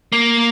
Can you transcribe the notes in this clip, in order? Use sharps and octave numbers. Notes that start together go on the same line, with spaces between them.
A#3